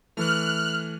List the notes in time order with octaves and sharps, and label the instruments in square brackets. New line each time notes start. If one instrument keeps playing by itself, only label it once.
[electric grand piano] E3 A3 [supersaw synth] F6 F#6